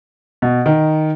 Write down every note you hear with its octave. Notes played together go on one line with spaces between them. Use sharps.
B2
D#3